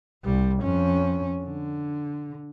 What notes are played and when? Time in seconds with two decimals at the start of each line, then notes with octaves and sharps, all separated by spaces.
0.24 C2 G3
0.62 F2 C#4
1.43 D3